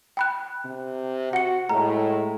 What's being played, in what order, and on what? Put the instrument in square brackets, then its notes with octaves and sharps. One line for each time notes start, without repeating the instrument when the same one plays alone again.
[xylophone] G5 B5 F#6
[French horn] C3
[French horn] F#4 [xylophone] F#5 C#7
[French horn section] A2 [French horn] G#3 [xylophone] A#5